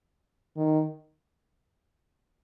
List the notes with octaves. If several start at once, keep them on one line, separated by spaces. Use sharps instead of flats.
D#3